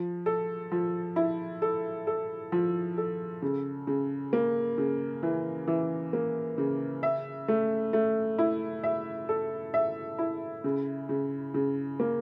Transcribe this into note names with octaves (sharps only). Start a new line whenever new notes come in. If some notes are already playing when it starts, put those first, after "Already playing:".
Already playing: F3
A4
F3
E4
A4
A4
F3
A4
C#3
C#3
A#3
C#3
E3
E3
A#3
C#3
E5
A3
A3
E4
E5
A4
E5
E4
C#3
C#3
C#3
A#3